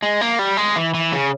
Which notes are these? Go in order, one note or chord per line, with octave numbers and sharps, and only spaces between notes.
G#3
A#3
G3
G#3
E3
E3
C#3